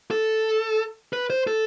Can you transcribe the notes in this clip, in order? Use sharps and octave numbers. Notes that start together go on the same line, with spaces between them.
A4
B4
C5
A4